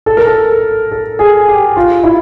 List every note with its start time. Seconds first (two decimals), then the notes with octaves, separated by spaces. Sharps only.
0.06 A4
0.17 A#4
0.27 A4
0.91 A4
1.19 G#4
1.48 G4
1.77 F4
2.04 E4